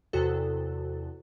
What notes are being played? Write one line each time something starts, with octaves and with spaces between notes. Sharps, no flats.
E2 C3 F#4 A4